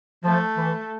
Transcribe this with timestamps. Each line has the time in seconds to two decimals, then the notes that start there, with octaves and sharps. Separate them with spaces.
0.24 F3 A3
0.57 E3